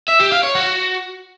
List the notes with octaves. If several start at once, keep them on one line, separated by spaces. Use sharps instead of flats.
E5
G4
F5
C#5
F#4